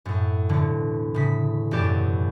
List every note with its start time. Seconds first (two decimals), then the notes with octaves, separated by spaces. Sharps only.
0.05 F#2 A2
0.49 E1 D3
1.14 A2 C#3 B6
1.71 E1 F#2 G4 D5 E7